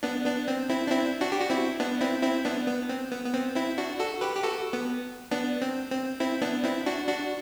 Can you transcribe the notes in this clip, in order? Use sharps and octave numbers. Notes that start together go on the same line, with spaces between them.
B3 D4
B3 D4
C4
C4 E4
D4
C4 E4
D4 F#4
G4
F#4
C4 E4
B3 D4
C4 E4
C4 E4
B3 D4
B3
C4
B3
B3
C4
C4 E4
D4 F#4
F#4 A4
G4 B4
G4
F#4 A4
B3
B3 D4
C4
C4
C4 E4
B3 D4
C4 E4
D4 F#4
D4 F#4